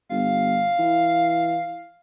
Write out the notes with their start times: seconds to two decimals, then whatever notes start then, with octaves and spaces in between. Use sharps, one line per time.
0.10 G1 F5
0.79 E3